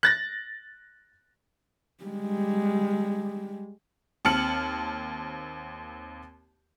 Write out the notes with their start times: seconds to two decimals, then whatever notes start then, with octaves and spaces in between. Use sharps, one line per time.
0.03 F#6 A6 A#6
2.04 G3 G#3
4.25 D#2 C4 A5 F6 C#7 F#7